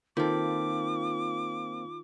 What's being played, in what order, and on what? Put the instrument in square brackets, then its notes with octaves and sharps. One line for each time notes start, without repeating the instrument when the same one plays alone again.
[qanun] D#3 A4 [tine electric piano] A#3 C4 F5 [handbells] F4 [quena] D6